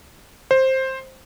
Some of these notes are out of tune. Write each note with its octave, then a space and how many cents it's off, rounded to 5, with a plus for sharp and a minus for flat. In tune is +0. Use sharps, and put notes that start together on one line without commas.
C5 +10